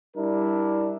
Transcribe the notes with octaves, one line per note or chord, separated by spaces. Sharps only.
G3 D4 E4 A#4